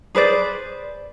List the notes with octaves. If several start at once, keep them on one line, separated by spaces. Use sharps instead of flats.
G#4 B4 C5 D5